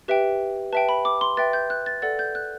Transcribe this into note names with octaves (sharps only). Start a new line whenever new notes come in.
G4 B4 E5 G5
B4 E5 G5 A5
B5
D6
C6
B4 E5 G5 A6
G6
F#6
A6
A4 D5 F#5 A6
G6
F#6